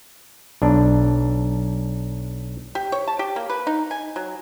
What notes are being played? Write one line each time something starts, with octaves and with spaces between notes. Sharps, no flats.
B1 D4
G4
C#5
A5
G4
A#3
B4
D#4
G#5
F#3